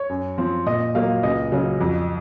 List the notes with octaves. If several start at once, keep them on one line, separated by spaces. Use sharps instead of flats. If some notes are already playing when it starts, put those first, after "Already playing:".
Already playing: C#5
F#2
F3 C4
A#2 D#5
F#3 A#3 F5
C#2 D#5
C#3 F#3
F2